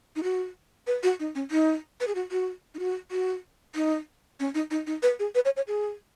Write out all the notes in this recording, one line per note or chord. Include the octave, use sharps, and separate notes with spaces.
D#4
F#4
B4
F#4
D#4
C#4
D#4
B4
G#4
F#4
F#4
D#4
F#4
F#4
D#4
C#4
D#4
D#4
D#4
B4
G#4
B4
C#5
C#5
G#4